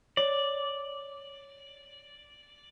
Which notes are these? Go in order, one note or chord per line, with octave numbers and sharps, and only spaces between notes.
C#5 D5